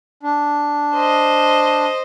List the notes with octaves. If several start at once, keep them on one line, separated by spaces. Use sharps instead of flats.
D4
C5 D#5